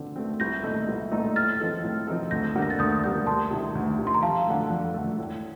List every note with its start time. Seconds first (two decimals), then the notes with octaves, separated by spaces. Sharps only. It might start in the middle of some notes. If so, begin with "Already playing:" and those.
Already playing: D3 C4
0.16 A3 C4
0.40 C2 G6 A#6
0.63 A#2 A3 D#4 A4
0.88 C2
1.12 A#2 A3 D#4 A4
1.35 A2 F6 A6
1.60 F3 C4 D#4 A4
1.83 A2
2.08 F3 C4 D#4 A4
2.31 D2 G6 A#6
2.55 D3 G3 A#3
2.62 A#6
2.70 A6
2.79 D2 D#6 G6
3.03 D3 G3 A#3 D#6 G6
3.26 D2 A5 C6
3.50 C3 D#3
3.75 D2
3.98 C3 D#3
4.07 C6
4.14 A#5
4.23 F2 F5 A5
4.47 D3 A3
4.70 F2
4.94 D3 A3
5.18 A2